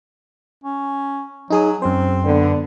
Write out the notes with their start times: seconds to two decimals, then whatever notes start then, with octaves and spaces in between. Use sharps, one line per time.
0.64 C#4
1.50 F#3 D#4 G#4 D#6
1.82 F#2 C4 C5
2.25 D3 B3